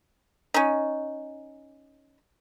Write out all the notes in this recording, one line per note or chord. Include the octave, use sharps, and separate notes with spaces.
C#4 D#4